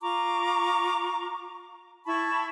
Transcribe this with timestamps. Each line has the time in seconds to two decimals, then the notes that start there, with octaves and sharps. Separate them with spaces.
0.01 F4 A#5 C#6 D6
2.07 E4 A5 B5 C#6